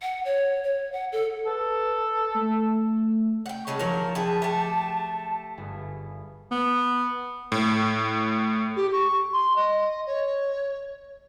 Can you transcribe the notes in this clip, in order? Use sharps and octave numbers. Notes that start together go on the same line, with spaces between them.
F#5
C#5
C#5
F#5
A4
A4 B4
A3
F#5 G5
C#3 F#3 G#3 A5
F#1 D#3 F3 F#3 G4 A#4
E4 G#4 F#5 G5
A3 G4
G1 G2 G#4
B3
A2
G4
C#6
C6
D#5
C#5